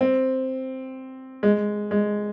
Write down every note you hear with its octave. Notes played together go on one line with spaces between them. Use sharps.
C4
G#3
G#3